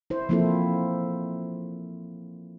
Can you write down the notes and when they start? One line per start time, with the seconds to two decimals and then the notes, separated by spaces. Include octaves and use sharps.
0.10 E4 C5
0.29 F3 A#3 C4 E4 F4 A4